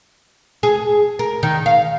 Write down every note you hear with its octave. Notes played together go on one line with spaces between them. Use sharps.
G#4
A#4
D#3
F5